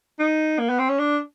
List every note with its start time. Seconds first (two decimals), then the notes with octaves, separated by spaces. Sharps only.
0.19 D#4
0.59 A#3
0.69 B3
0.79 C4
0.89 C#4
0.99 D4